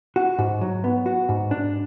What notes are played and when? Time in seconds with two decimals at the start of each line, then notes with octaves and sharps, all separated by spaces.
0.16 F#4
0.39 G#2
0.61 F#3
0.84 B3
1.06 F#4
1.29 G#2
1.51 D4